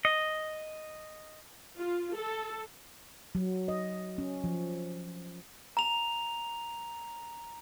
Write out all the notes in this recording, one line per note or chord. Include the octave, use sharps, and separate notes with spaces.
D#5
F4
A4
F#3
D#5
C#4
F3
A#5 F7